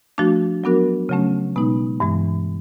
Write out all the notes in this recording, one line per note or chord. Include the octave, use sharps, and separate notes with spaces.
F3 A3 D4 F#4
F#3 B3 D4 F#4 A#4
C#3 F#3 A3 C#4
B2 G#3 B3 D#4
G2 E3 G#3